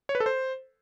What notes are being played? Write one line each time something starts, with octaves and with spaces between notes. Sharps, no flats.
C#5
B4
A4
C5